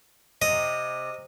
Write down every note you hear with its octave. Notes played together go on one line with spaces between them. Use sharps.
C3 D#5